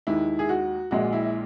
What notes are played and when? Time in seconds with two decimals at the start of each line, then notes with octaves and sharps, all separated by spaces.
0.07 D#2 D#3 G#3 E4
0.39 G#4
0.49 F#4
0.91 A#1 A#2 G#3 F#4
1.13 E4